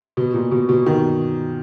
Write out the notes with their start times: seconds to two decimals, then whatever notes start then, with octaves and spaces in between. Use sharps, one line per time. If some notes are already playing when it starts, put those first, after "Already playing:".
0.17 B2
0.34 A#2
0.52 B2
0.69 B2
0.86 D#3